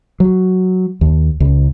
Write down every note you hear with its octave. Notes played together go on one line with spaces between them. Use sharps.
F#3
D#2
C#2